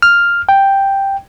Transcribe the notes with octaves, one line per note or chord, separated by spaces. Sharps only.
F6
G5